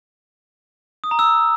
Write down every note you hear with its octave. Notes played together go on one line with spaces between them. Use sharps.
D#6
A#5
E6